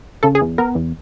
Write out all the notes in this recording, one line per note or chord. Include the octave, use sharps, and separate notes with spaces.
C#3 A4
G#4
E2
B3 A#4
E2